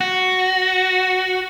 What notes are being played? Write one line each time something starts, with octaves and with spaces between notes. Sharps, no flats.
F#4